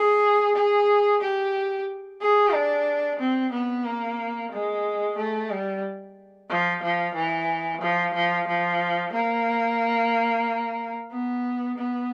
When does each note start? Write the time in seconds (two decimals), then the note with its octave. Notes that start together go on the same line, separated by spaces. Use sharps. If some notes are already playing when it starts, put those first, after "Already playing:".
Already playing: G#4
0.56 G#4
1.21 G4
2.21 G#4
2.54 D4
3.20 C4
3.52 B3
3.86 A#3
4.52 G#3
5.17 A3
5.51 G3
6.50 F3
6.83 F3
7.15 E3
7.82 F3
8.14 F3
8.48 F3
9.13 A#3
11.12 B3
11.78 B3